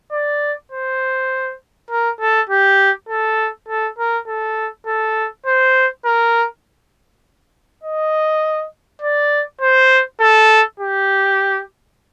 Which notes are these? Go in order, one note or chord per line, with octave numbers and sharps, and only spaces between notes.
D5
C5
A#4
A4
G4
A4
A4
A#4
A4
A4
C5
A#4
D#5
D5
C5
A4
G4